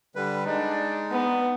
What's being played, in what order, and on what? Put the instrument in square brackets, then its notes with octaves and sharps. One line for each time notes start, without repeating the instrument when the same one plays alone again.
[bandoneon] D3 G3 B4
[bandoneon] G#3 D#4 [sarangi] D4
[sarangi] B3